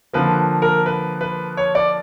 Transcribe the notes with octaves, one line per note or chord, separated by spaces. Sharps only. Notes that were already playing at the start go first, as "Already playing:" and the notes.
D3 F3 A#3 B4
A#4
B4
B4
C#5
D5